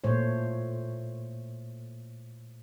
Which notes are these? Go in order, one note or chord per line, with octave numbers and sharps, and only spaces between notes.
A#2 A3 C5 C#5